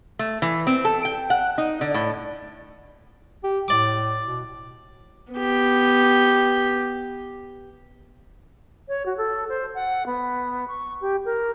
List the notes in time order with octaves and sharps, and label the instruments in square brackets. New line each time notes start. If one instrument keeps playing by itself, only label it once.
[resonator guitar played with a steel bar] A3
E3
C4
A4
G5
F#5
D#4
D3
A2
[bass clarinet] G4
[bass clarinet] A2 [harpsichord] D5 D6
[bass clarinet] B2
[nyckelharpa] B3 G4
[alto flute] C#5
F#4
A4
C5
F#5
B3
C#6
G4
A#4